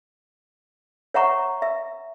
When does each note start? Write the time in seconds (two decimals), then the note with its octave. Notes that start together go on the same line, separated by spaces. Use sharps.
1.14 C#5 E5 F#5 A#5 C#6
1.62 E5